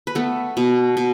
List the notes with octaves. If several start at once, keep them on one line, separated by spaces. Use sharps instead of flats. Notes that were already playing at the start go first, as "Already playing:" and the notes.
B4
A3 B3 A4
B2
B2